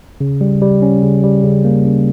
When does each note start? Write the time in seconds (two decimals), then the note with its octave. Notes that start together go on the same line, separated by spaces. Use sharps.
0.21 C#3
0.41 G3
0.62 G3
0.82 C#4
1.03 C#3
1.24 G3
1.44 C#3
1.65 A#3
1.85 C#3